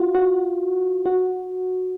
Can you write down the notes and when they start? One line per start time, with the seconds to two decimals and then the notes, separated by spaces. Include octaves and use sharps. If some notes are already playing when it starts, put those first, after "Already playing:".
Already playing: F4 F#4
0.15 F#4
1.06 F#4